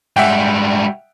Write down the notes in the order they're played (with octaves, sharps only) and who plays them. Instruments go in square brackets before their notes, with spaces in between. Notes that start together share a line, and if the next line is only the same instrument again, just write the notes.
[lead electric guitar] G#2 G3 [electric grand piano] E5 F#5 G5